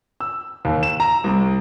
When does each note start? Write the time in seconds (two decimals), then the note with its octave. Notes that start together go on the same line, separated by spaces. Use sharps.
0.20 E6
0.65 D#2
0.83 E7
1.00 A#5
1.24 C2